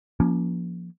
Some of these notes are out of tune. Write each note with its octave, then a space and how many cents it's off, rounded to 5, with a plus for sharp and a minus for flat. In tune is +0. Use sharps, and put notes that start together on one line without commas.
F3 +0 A#3 +25 C#4 +25